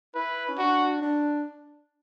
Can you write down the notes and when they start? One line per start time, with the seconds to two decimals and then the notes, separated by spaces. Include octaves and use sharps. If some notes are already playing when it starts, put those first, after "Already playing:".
0.15 E4 B4
0.49 C#4
0.58 D4 F#4
1.02 D4